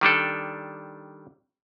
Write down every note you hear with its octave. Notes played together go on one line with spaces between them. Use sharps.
D#3 G3 D4 A4